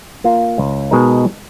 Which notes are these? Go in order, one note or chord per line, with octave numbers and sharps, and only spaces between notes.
A#3 F4
C#2
B2 G#3 D#4 A#4